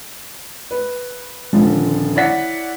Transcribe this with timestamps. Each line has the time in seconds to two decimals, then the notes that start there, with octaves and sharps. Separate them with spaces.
0.71 B4
1.53 D#1 D3 F3
2.16 E4 C#5 D5 F#5 B6